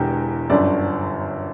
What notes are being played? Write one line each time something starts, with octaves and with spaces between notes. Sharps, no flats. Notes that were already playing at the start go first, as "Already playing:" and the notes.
Already playing: E1 E2 D3 G4
G1 F#2 D3 D5